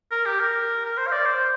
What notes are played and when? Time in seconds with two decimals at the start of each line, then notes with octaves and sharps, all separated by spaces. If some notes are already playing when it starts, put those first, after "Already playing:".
0.11 A#4
0.26 G4
0.40 A#4
0.85 A#4
0.97 C5
1.07 F5
1.12 D5
1.26 C5